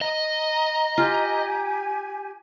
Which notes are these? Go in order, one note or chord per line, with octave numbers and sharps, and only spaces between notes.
D#5 A#5
F4 G4 G#5